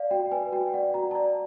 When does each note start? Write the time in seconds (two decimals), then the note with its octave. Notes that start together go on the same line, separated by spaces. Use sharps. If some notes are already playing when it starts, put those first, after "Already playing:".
Already playing: D5 F5
0.11 F#4 G5
0.32 B4 G#5
0.52 F#4 G5
0.67 G5
0.74 D5 F#5
0.94 F#4 A#5
1.11 A5
1.15 D5 A#5